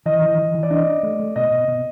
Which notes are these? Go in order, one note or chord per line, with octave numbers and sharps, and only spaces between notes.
E3 D#5
E3
E3
E3
D5
D4 D#5
D4
A3
A3
B2 D#5
B2
B2